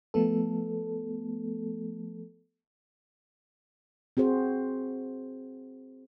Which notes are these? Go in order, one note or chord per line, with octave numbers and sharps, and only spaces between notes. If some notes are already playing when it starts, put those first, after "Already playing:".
F3 A3 B3 A4
C4 F#4 G#4 C5